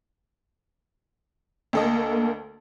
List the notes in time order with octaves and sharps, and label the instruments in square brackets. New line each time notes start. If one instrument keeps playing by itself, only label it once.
[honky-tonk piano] D2 A4 D#5 [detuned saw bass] A#3